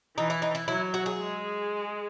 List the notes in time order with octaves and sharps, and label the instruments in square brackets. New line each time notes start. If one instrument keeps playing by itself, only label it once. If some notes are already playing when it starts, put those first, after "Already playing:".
[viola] E3 [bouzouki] D#4
[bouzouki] E4
D#4
E4
[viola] F#3 [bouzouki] E4
[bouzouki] F#4
G#4
[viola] G#3